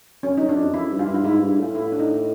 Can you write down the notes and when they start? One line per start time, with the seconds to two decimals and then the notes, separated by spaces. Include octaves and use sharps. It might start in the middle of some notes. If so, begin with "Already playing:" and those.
0.23 F#2 C#4
0.37 F#2 D#4
0.49 D4
0.56 F2
0.73 F#2 E4
0.90 G2
0.99 F4
1.07 G2 E4
1.14 F4
1.24 G#2 E4
1.40 G2
1.58 A2 F4
1.75 E4
1.92 D4
1.99 D#4